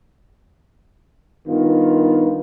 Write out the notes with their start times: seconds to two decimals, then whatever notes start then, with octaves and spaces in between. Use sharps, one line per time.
1.47 G2 D#3 B3 F4